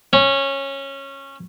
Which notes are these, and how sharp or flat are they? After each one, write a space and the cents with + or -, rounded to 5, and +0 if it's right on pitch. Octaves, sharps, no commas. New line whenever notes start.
C#4 -15